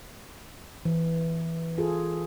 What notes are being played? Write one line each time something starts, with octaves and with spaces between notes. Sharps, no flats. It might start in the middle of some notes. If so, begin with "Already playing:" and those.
E3
F4 G#4 A4